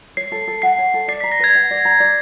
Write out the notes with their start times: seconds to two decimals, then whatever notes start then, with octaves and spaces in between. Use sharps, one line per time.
0.17 C#5 C7
0.32 A4
0.48 A4
0.62 F#5 C7
0.79 C#5
0.94 A4
1.08 D5 C7
1.20 A#5 B6
1.32 A#6
1.40 B4 G#6
1.55 F#5
1.71 D5
1.85 A#5
2.00 D5